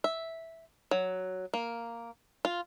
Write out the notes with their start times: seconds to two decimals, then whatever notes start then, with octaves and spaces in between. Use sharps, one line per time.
0.04 E5
0.91 F#3
1.54 A#3
2.45 F4